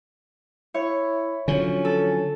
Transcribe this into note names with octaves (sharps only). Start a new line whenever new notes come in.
E4 C#5
D3 F3 F#3 C#4
A4